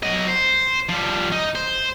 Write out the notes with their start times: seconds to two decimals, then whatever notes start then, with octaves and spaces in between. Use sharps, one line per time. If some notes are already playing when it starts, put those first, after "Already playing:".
0.03 F#3 D#5
0.28 C5
0.89 F3 G3
1.32 D#4
1.55 C5